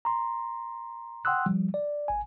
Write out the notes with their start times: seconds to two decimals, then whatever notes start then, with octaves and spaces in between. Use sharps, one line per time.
0.05 A#5 C6
1.25 F#5 G5 C6 D#6 E6 F#6
1.46 F3 G3
1.74 D5
2.08 G#1 G#5